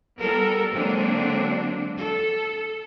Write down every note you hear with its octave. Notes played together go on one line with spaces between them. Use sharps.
G3 B3 A4 A#4
D3 F#3 G#3 A#3 C4 D4
A4